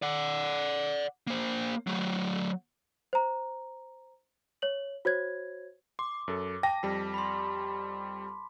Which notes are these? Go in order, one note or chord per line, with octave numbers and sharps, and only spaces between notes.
D5 F#5
A#3 C5
F#3 A3
C5 A#5
C#5 F#7
F#4 C5 C#5 G#6
C6 D6
F#2 A4
G5 A5 A#6
F2 G3 B6
B5 C6